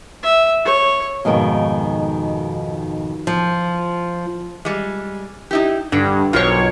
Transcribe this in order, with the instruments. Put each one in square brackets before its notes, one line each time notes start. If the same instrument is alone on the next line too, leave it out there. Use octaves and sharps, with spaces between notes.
[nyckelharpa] E5
C#5
[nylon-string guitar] F2 G#2 B2 D#3
F3
[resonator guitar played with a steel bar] G3 G#3
D#4 E4 G4
[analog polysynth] G2 [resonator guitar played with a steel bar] D3
[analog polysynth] B1 C#5 [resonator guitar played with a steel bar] F4 A#4 C5